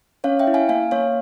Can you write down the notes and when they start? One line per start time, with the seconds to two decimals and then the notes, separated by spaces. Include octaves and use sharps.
0.24 C#4 C#5 F5
0.39 E5 G5
0.47 E4
0.54 F5 G#5
0.69 A#3 F5 G#5
0.91 A#3 C#5 F5